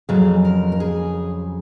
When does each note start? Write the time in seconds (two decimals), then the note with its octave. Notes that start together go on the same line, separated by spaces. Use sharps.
0.09 F2 C#3 F#3 G#4
0.45 A#4
0.72 A#4
0.80 G#4